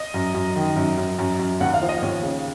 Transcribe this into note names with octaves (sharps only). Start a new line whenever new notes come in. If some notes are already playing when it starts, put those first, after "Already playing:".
Already playing: D#5
F#2
F#2
D#3
F#2
F#2
F#2
F#2
D#2 F#5
F5
F3
D#5
D#2 C#5
C#3